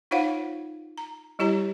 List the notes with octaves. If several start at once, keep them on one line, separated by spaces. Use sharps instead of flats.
D#4 F4 C5 C#5 F5 F#5
A#5
G3 E4 G4 C#5 A#5